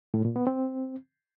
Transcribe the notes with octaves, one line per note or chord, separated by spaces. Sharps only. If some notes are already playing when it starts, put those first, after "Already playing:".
A2
A#2
B3
C4